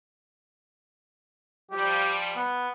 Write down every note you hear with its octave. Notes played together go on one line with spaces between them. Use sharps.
F3 G3 G4
B3